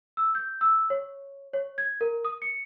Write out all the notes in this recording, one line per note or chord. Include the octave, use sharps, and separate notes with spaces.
E6
G6
E6
C#5
C#5
G#6
A#4
D#6
C#7